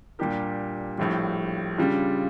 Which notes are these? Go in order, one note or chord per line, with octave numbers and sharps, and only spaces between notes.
A#2 G3 D4 G4 A#4
A#1 A2 G3
C#3 G3 D4 F4